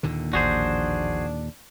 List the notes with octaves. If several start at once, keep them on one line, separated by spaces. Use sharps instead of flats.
D#2 A#2 D3
A1 F3 D4 F#4 G#4 C5